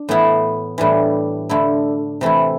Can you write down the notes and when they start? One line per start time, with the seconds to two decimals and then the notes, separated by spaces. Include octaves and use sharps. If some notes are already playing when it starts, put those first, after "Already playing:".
Already playing: D4
0.09 A2 E3 B3 E4
0.78 A2 E3 G3 D4
1.49 D3 A3 E4
2.21 C3 E3 A3 E4